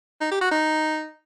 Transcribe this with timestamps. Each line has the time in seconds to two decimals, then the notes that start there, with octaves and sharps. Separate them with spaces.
0.21 D#4
0.32 G4
0.42 F#4
0.52 D#4